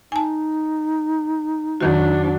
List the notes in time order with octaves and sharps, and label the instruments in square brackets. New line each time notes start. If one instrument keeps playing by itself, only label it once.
[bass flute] D#4 [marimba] G#5 A5
[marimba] F2 D#3 F#4 [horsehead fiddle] F#3 D4